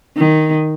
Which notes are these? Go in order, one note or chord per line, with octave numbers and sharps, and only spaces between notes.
D#3